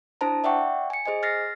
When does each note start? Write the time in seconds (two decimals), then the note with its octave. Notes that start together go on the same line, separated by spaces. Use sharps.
0.21 D4 E4 C5 A5 A#5
0.44 D5 E5 F#5 G5 C#6
0.90 G#5 C#7
1.06 G#4 C5 D#5 G#5
1.23 F6 A6 A#6 C7